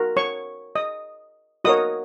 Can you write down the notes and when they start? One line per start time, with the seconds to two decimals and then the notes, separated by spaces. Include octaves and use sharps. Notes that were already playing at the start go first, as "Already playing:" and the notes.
Already playing: F#4 A#4
0.17 C#5 C#6
0.75 D#5 D#6
1.64 F#4 A#4 C#5 D#5 D#6